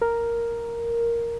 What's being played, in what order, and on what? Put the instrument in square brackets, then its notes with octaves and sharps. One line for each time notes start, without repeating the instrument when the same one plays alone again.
[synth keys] A#4